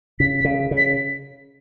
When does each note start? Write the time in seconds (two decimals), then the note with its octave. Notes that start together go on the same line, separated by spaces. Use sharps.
0.20 C#3 B6
0.39 B6
0.45 C#3
0.71 C#3
0.77 B6